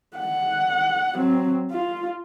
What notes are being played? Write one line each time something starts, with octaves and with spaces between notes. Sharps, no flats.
F#5
F#3 C4
F4